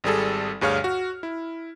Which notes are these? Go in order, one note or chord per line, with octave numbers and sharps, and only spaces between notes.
G#1 G3 G#4 A4
D2 G2 G#4 C#5 F5 F6
F#4
E4